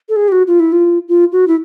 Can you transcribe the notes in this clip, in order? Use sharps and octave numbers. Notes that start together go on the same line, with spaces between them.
A4
G#4
G4
F#4
F4
E4
F4
F4
F#4
E4